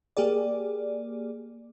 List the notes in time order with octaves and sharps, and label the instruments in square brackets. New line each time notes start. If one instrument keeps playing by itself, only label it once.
[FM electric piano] A#3 G4 G#4 D5